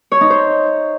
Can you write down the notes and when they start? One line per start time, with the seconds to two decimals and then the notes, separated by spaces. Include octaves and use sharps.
0.12 C#5
0.21 D#4
0.30 C5